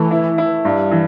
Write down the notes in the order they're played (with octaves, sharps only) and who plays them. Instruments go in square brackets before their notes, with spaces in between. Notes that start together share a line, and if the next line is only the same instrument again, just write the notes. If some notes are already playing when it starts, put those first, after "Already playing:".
Already playing: [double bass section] E3 [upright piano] A3
[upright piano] E4
E4
[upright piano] G2 [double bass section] G3
[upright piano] E3